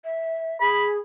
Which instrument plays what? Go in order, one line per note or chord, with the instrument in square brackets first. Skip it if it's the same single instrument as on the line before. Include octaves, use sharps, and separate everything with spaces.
[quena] E5
[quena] G#4 [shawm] B5